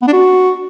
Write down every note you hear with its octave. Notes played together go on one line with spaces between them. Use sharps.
B3
D4
F#4